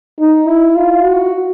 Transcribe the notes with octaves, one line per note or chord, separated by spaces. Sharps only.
D#4
E4
F4
F#4